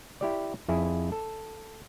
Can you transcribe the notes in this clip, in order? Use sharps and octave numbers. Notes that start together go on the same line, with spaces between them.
E4 G4 D5
F2 E4 G#4
A4